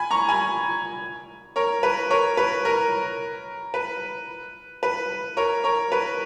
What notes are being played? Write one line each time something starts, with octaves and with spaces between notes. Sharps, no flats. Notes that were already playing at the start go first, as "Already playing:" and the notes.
Already playing: G#5 B5
A#5 C#6
G#5 B5
A#4 C#5
B4
A#4 C#5
B4
A#4
B4
B4
A#4 C#5
A#4 C#5
B4